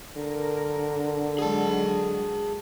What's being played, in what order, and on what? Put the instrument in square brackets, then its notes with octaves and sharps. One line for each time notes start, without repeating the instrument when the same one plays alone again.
[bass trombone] D3 [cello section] A#4
[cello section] F#3 G#3 [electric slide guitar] G#4 A5